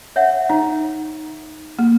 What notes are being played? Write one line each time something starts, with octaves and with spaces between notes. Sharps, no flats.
C#5 E5 F#5
D#4
A#3